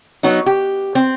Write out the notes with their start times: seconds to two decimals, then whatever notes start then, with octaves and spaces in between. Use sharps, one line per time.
0.23 F#3 B3 D#4
0.46 G4
0.95 C4